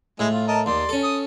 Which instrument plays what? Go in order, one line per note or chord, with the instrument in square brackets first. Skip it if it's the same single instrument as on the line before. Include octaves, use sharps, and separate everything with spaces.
[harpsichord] A2 [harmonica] G#3 E4
[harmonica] F4
A#4 D#5 A5
[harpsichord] D#2 [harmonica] D5 C6
[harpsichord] C#4 A4
[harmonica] D#6